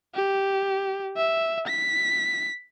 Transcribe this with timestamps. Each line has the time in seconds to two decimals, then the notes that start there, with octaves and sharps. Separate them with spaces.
0.15 G4
1.17 E5
1.67 B6